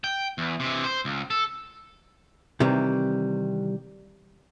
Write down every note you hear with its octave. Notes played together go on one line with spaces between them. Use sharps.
G5
E2
C3 E3
C5
C#2
A4
C3 D#3 E3 G3